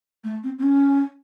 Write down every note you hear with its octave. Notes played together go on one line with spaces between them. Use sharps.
A3
C4
C4
C#4